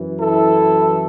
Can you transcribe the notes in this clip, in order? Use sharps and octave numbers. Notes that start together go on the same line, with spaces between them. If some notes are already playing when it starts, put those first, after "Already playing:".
Already playing: F#2 E3
E4 A4